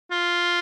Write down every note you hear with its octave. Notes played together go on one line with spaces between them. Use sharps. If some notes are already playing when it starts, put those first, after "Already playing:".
F4